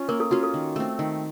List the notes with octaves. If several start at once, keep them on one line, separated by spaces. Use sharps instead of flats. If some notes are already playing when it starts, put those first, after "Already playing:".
Already playing: C#4 F4
A#3 A#4
A4
C#4 F4 F#4
A4
D#3
A3 C4
D#3